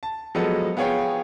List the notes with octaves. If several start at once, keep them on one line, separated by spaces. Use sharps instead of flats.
A5
F3 F#3 G#3 B3 A4 D#5
B3 F4 G#4 C#5 F5 G5